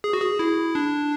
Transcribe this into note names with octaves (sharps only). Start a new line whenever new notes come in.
G#4
F#4
G#4
E4
D4